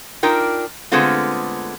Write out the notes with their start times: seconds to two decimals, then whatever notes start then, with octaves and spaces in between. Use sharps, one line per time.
0.23 D4 D#4 F4 A#4 G5
0.92 D3 G#3 A3 B3 C4 F4